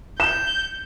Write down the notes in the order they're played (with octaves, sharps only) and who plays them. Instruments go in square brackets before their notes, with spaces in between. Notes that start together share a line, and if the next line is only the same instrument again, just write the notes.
[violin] G6 [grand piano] E7